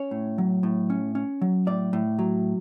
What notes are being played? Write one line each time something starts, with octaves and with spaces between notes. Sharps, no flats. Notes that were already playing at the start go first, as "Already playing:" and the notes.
Already playing: C#4 C#5
A2
F#3
A2
C#4
C#4
F#3
A2 D5
A2
F#3